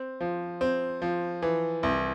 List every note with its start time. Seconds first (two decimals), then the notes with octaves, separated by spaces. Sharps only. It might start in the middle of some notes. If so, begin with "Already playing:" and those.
Already playing: C4
0.21 F3
0.61 C4
1.02 F3
1.42 E3
1.83 C2